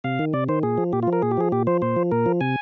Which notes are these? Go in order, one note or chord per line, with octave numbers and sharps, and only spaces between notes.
C3 F5
D#3
C3 D5
D#3 C5
A#2 G#4
F3
A#2 G4
F4
F3
A#4
A#2 G#4
G4
F3 G#4
A#2 G4
F3 C5
A#2 C5
F3
A#2 A#4
F3
C3 G#5